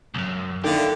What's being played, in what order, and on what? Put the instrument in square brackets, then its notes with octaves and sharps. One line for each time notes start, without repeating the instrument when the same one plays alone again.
[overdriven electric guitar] C2 F#2
[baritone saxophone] D3 [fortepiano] D#3 A#3 E4 [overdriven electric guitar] G4